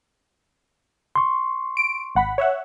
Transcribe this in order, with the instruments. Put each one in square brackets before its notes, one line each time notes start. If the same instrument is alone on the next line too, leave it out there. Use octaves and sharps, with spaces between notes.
[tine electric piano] C6 C#6
[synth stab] D7
G#1 F#5 B5
C#5 E5 F#5